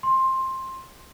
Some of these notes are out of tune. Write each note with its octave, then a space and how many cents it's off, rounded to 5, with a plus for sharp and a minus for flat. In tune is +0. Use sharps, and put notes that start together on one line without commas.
C6 +15